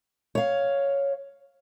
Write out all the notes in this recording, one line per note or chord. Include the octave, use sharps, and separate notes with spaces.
C#5 F5